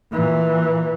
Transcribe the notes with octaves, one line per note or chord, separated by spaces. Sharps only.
A#2 E3